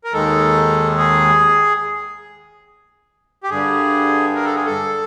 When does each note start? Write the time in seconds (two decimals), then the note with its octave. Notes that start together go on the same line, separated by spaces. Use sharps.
0.04 A#4
0.13 D#2 D#3 G#3 A4
0.98 G#4
3.44 G4
3.49 G2 D3 G3 G#4
4.35 A#4
4.45 A4
4.55 G#4
4.66 A4